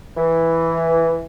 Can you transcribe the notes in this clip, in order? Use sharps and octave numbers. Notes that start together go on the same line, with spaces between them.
E3